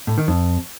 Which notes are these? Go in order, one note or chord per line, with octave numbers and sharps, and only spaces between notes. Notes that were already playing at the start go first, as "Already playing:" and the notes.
A2
D#3
F2